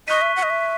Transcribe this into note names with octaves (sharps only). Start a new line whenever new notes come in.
D#5 C#6 F#6 B6 D#7
E5
F#5
D#5
E5